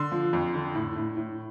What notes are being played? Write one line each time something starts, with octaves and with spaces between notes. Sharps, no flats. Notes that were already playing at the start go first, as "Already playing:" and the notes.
Already playing: D3 C6
F3
F2
D3
A2
A2
A2